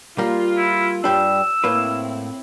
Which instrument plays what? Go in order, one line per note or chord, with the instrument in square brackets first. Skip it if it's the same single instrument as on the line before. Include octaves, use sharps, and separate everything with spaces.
[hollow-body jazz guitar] G3 A#3 [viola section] F4
[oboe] E4
[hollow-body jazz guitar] G2 G3 D4 [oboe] E6
[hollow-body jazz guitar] A2 A#3 B4 [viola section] C4 E4